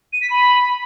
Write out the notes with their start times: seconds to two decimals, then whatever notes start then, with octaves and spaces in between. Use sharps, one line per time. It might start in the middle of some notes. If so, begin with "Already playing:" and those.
0.13 D#7
0.21 B6
0.30 B5